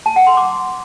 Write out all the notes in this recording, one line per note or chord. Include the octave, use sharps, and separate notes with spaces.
A5
F#5
C6
D6